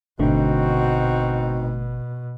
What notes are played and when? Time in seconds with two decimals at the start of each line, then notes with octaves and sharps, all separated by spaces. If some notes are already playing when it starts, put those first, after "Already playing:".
0.19 G#1 B2 D3 A3 C4 D#4 F#4